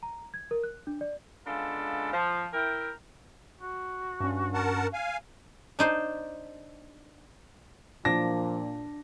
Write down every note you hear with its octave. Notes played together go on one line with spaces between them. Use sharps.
A#5
G#6
A#4
F#6
D4
D5
C#3 G#3 B3 D4 F4 A4
F3
E4 A#4 G5
F#4
G2 C#4
A#4 F#5 A5
F5 G#5
D4 D#4 C5
A#2 F3 D4 A#6